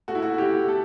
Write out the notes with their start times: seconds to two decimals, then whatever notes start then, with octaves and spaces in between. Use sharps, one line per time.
0.08 A3 F#4
0.15 E4
0.22 F#4
0.38 E4 G4
0.68 A4